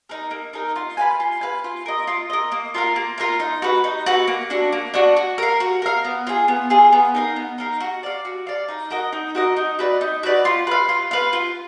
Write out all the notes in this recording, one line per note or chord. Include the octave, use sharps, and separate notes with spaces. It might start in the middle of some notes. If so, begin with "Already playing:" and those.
D#4 A#4
A#3
D#4 A#4
F4
B4 F5 G#5
F4
B4 F5 G#5
F4
A#4 D#5
F4
A#4 D#5
A#3
F4 A#4 F5
A#3
F4 A#4 F5
D#4
F#4 B4
D#4
F#4 B4
A#3
D4 F#4
A#3
D4 F#4
F#4
A#4 F5
F#4
A#4 F5
B3
F4 G#4
B3
F4 G#4
B3
D#4 A#4 F5
B3
D#4 A#4 F5
F#4
D5 F5
F#4
D5 F5
D#4
F#4 A#4 D#5
D#4
F#4 A#4 D#5
D#4
F#4 B4 D5
D#4
F#4 B4 D5
F4
B4 F5
F4
B4 F5
F4